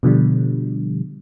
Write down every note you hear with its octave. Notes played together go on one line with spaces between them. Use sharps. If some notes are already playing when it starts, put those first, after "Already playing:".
B2 D3 F3 G3